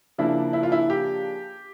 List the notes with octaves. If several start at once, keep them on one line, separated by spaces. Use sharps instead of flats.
C#3 F3 A#3 D4 E4
E4
F4
E4
G4